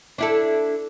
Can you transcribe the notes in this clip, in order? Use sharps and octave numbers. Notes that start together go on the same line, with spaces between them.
D4 E4 A4